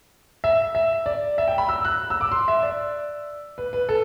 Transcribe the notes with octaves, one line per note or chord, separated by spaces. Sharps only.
E5
E5
D5
E5
G5
B5
E6
F#6
E6
D6
C6
E5
D5
B4
B4
A4